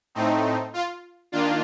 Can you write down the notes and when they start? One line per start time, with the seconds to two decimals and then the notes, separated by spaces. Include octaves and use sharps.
0.15 A2 A3 C4 D#4
0.73 F4
1.32 D#3 A#3 D4 F4